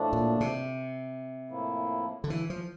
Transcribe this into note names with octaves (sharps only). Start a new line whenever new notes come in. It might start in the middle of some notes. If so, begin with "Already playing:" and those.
Already playing: A2 F3 A3 D4
A#2
C3
A2 F3 A#3 E4
D3
E3
F3